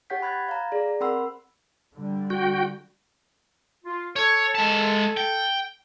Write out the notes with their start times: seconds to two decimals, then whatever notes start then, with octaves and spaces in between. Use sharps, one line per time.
0.10 G4 C#5 F#5 G6 B6
0.22 B5 F#6 G#6 A6
0.49 F5 A#5
0.72 G#4 D5
1.00 C4 A#4 F#5 B5 C6 E6
1.95 D3 G3
2.30 F#4 G5
3.85 F4
4.16 A4 C#5
4.55 G#3 A5
5.17 G5